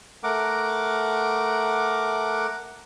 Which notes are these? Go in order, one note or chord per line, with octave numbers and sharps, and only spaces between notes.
A3 A#4 F#5 D6